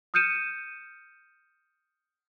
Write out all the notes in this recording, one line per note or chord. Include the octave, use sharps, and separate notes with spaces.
D#6 F6 G6 C#7 D#7 E7